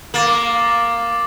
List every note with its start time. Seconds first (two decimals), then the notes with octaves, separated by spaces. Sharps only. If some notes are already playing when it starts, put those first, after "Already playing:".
0.14 A#3 D6 A6 F#7